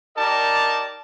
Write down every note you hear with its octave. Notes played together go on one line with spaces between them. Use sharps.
D#4 G4 A#4 D5 A5